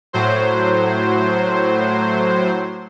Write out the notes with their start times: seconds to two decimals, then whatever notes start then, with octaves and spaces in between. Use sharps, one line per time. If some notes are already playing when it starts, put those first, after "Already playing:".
0.13 A2 F#3 C5